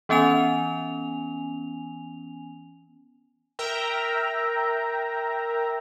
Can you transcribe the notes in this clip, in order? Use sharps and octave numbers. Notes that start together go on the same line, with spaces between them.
E3 B3 C#4 G#5 F7
A#4 E5 G5 A#5